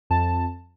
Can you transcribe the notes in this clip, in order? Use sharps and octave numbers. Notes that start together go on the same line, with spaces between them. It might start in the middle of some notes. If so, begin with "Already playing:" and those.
F2 A5